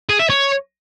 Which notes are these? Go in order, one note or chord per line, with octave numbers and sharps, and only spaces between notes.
G#4
E5
C#5